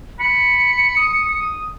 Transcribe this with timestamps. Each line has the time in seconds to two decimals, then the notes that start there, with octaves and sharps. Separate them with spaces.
0.20 B5 C#7
0.97 D#6